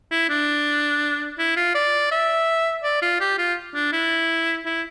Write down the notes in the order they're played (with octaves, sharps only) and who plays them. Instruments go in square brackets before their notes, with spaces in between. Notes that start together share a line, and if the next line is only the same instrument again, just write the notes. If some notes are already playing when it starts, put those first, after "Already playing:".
[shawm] E4
D4
E4
F4
D5
E5
D5
F4
G4
F4
D4
E4
E4